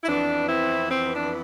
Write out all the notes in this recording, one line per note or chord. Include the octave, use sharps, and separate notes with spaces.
E4
F2 E3 B3 D4
C4 E4
C4
D4